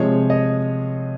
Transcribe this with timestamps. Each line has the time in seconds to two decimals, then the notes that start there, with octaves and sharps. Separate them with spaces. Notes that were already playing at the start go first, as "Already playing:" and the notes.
Already playing: C3 F3 G#3 C#5
0.30 D#5